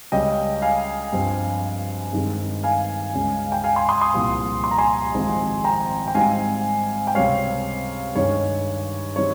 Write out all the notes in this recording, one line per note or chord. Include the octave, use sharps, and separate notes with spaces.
C#2 C#3 G3 C#4 D#5 G5
F5 G#5
G2 F3 C4
G2 D#3 G#3 C4
F5 G#5
C#2 C#3 G#3 C#4
G5
F5 G#5
G#5 C6
C6 D#6
C6 D#6
C2 A#2 F3
C6
A#5
G#5 C6
G#1 G#2 F3 G#3 C4
G5 A#5
G5
G#2 G3 C4 F5 G#5
G5
C#2 C3 G3 C4 C#5 F5
G2 D#3 G#3 C#4 C#5
D#3 G3 C4 C#5